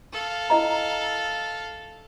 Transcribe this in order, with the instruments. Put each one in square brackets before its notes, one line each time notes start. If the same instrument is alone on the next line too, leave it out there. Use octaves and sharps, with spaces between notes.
[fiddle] A4 F5
[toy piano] E4 D#5 A#5